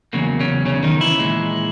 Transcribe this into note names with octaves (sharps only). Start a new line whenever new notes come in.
E2 C#3 F#3 A#3
C#3 C#4
C#3 C#4
D#3 D#4
E3 E4
A#2 G#3